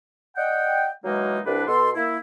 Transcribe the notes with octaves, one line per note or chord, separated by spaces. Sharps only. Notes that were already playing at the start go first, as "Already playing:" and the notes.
D5 D#5 F#5 G5
E3 F#3 G#3 A#3 D#4 F#4
C2 D4 B4
B2 A4 C6
A#3 E4